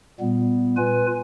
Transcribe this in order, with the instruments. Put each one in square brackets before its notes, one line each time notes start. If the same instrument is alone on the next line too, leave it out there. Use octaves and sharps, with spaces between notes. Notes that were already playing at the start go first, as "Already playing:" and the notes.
[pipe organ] A#2 G3 B3
F4 B4 G#5